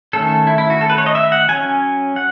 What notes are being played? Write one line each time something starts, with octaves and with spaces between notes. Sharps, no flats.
D#3 A3 C#4 A4
E4
E4
F#4
A4
B4
C#5
D#5
E5
F#5
F#3 C#4 G#5
F#5